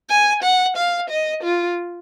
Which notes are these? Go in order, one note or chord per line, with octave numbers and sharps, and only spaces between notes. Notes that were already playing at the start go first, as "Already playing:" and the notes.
G#5
F#5
F5
D#5
F4